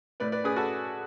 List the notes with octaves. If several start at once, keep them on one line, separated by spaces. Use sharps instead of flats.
A2 B4 D5
B4 D5
C#4 G#4 B4
F#4 A4